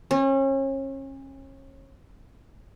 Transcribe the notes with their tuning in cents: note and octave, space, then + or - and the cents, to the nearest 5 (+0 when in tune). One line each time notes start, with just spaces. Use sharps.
C#4 -35